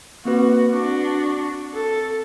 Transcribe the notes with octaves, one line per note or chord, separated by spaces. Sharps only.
A#3 C4 F#4 B4
C4 D4 F#4
A4